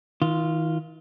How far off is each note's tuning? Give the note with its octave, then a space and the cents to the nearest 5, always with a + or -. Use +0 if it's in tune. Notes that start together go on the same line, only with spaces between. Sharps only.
D#3 +40 F4 -10